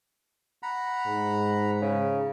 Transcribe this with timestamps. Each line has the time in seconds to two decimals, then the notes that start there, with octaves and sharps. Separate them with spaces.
0.63 F#5 A#5 B5
1.07 G#2
1.82 C#3